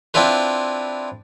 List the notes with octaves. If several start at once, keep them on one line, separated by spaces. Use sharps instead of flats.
C4 D4 E4 F4 B4